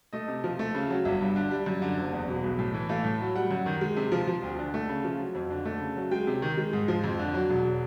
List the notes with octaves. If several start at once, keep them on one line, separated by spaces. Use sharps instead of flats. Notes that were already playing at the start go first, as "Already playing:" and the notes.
A3 D#5
C3
F3
A3
C#3
F#3
G1 E5
G2
D3
G3
F#2
D3
F#1
E2
B2
B1
A2
E3
A3 F5
A2
F#3
G3 F#5
F#2
D#3
G#3
C3
F3
F3
D2
D3
A3
C#3
F3
F#3
F2
D3
A3
C#3
F#3
G#3 G5
C3
D#3
G#3
G#2
F3
F2
D3
F#3
E1